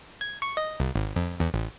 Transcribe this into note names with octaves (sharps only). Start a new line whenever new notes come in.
G#6
C#6
D#5
C2
G#1
F2
E2
A1